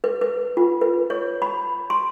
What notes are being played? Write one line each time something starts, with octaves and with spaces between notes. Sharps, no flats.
B4
B4
F4
B4
C#5
B5
C6